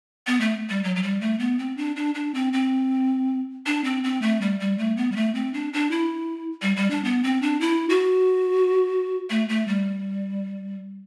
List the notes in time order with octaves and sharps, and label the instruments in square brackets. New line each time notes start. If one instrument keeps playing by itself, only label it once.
[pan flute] B3
A3
G3
F#3
F#3
G3
A3
B3
C4
D4
D4
D4
C4
C4
D4
C4
C4
A3
G3
G3
A3
B3
G3
A3
C4
D4
D4
E4
G3
G3
D4
B3
C4
D4
E4
F#4
A3
A3
G3